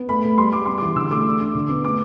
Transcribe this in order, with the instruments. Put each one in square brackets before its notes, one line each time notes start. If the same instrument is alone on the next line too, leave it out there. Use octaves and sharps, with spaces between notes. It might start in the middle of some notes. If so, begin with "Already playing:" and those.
Already playing: [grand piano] B3
[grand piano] A3 [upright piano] B5
[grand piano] A3
[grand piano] G3 [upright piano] C6
[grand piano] G3 [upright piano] D6
[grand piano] B3 [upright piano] C6
[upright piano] D6
[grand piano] E3
[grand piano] D3 [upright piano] E6
[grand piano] A3 [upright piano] D6
[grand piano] D4
D4
D3
B3
[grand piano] A3 [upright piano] D6